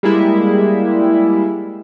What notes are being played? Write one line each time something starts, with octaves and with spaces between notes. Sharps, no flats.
G3 G#3 A#3 E4